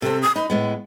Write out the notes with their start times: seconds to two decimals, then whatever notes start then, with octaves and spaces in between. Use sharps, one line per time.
0.02 C3 C4 A4
0.22 D#6
0.36 D#4 B5
0.50 A2 G#3 B3